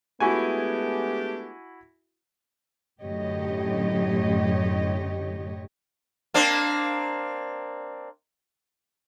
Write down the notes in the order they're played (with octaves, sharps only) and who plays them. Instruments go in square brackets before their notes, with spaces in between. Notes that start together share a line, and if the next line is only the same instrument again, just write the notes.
[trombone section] G#3 A3 B3 [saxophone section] D4 G4 [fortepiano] E4 F#4 G#5
[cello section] F#2 A2 D3 G4 C#5 D#5
[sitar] A#3 C4 D4